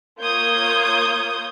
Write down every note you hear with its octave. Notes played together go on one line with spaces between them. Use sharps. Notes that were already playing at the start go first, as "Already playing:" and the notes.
A#3 F4 C#5 D#6 G6 G#6